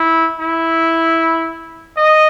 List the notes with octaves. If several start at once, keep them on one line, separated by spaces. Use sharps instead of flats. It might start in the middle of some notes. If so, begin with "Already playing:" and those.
Already playing: E4
E4
D#5